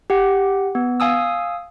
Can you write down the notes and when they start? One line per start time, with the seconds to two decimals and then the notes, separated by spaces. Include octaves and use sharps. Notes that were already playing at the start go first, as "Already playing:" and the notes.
0.10 G4 F#5
0.75 B3
1.00 F5 G#5 D#6 E6